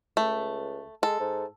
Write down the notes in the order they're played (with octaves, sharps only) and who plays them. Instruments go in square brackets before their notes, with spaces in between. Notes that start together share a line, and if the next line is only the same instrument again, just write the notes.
[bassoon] C#2 [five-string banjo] A3
[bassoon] G#3 [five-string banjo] A4
[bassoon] G#2